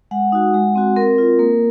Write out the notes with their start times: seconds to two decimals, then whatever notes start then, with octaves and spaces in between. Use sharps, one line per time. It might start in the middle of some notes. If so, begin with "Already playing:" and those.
0.11 G#3 F#5
0.32 D#4 F#4
0.54 G#3
0.75 C4 F#4
0.96 C4 A#4
1.18 F4
1.39 A#3